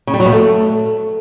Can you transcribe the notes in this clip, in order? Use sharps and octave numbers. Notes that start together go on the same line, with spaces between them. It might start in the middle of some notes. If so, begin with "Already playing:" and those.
C#3
G3
F#3
B2
A3